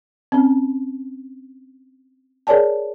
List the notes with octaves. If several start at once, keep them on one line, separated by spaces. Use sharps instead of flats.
C4 C#4
G#4 A#4 C#5 D5 G#5 A5